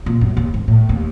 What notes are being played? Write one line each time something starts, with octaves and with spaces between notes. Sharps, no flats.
A#2
F#2
D#2
G#2
A2
D#2